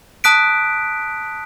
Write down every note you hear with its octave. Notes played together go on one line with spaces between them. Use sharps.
A5 D#6 F#6 B6 D7